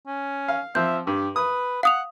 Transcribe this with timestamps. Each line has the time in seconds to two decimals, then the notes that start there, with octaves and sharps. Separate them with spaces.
0.07 C#4
0.48 F5
0.75 F3 C4 E5 G6
1.07 G2 G4
1.36 B4 D#6
1.83 F5 F#5 D#6 F7